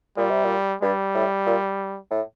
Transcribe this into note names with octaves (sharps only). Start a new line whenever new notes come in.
A#2 G3
C3
A#2
G2 G3
A2
A#2
A2